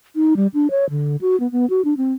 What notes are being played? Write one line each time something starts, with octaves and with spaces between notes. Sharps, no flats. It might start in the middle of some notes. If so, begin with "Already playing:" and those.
D#4
G3
D4
C#5
D3
F#4
B3
B3
F#4
D4
C4